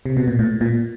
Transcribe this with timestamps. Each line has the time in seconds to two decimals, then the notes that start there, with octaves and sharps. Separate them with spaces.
0.06 C3
0.17 B2
0.28 A#2
0.39 A2
0.61 A#2